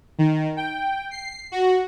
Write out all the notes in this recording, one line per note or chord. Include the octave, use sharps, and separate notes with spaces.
D#3
G5
C7
F#4